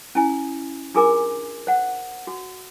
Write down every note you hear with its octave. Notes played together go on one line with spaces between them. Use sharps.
C#4 E4 G#5
D4 F4 G#4 A#4 G#5 D6
C5 F#5
F#4